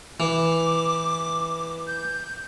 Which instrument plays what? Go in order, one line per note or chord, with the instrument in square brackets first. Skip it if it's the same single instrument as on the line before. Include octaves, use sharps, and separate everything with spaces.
[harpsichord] E3 [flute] D6
[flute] G6